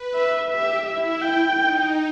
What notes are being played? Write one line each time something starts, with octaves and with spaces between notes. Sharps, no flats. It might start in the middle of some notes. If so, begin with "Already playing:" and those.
Already playing: B4
E5
G4 E5
E4 E5
G5
D#4